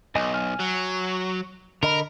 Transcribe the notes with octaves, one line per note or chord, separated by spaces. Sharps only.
B1 D#5 G#5
G#5 F6
F#3
D3 A#4 D#5 B5